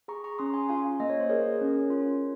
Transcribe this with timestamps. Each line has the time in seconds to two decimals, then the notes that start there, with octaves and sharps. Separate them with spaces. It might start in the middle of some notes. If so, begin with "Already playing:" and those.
0.08 G#4 A#5 C#6
0.24 A#5 C#6
0.38 C#4 C6 D#6
0.54 G#5 C6
0.69 F4 F5 G#5
1.00 A#3 D#5
1.10 C#5
1.20 C5
1.30 G#4 A#4 C#5
1.61 C#4
1.90 F4